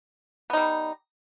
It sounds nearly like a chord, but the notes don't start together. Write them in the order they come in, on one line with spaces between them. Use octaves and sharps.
B3 D#4 G3